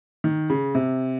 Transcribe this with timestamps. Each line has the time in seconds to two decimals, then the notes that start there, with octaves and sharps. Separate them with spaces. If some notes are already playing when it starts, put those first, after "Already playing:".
0.24 D#3
0.50 C#3
0.75 C3